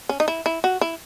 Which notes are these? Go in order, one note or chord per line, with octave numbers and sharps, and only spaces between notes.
C#4
D#4
E4
E4
F#4
E4